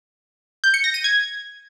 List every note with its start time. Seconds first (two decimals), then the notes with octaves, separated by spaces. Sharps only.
0.64 G6
0.74 C#7
0.84 A#6
0.94 D#7
1.04 G#6